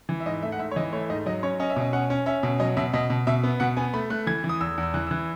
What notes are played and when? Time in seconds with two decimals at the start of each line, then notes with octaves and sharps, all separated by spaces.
0.09 E3
0.20 E5
0.26 G#2 D#5
0.43 A3 E5
0.52 F#5
0.59 G#2 E5
0.71 C#5
0.76 E3 D#5
0.93 A3 C#5
1.02 E5
1.10 G#2 D#5
1.26 F#3 D#5
1.43 C#4 C#5
1.60 C#4 D#5
1.70 E5
1.76 B2 D#5
1.93 C#4 F#5
2.10 C#4
2.26 C#4 E5
2.43 B2
2.60 F#3 D#5
2.77 B2 E5
2.93 B2 D#5
3.10 B2
3.27 B2 E5
3.43 B3
3.60 B2 F#5
3.77 B3 G#5
3.94 A3 B5
4.10 A3 F#6
4.27 E3 G#6
4.44 E3
4.49 D#6
4.60 E2 E6
4.78 E2
4.83 E6
4.94 E3 F#6
5.07 E6
5.11 E3 F#6